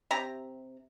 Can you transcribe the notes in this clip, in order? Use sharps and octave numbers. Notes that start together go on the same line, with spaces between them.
C3 G4 A#5